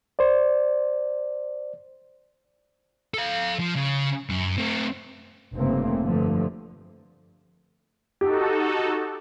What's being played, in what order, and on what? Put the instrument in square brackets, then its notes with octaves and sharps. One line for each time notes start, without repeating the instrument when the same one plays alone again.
[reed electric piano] C5 D5
[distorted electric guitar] A4 F5
F3
C#3
F#2
A3 C4
[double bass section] F1 G2 C#3 A3 A#3 C4
G2 D3 F3 A3
[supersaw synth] D#4 F#4 A4 [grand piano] G4